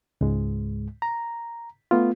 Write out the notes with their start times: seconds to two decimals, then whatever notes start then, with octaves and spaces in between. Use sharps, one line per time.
0.21 C#2 G#2 G#3
1.02 A#5
1.91 A3 B3 F4